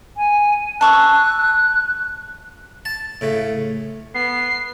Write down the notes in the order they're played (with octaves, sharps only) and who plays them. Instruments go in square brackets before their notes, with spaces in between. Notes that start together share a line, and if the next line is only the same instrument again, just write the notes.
[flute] G#5
[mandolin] A5 C#6 E6 [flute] F#6
[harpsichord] A5
A2 C#3 A3
[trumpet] B3 [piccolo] C7